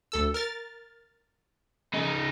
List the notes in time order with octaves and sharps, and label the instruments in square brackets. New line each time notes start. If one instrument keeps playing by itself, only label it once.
[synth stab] D2 A4 E6
A#4 F6 A6
[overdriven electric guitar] C#3 D#4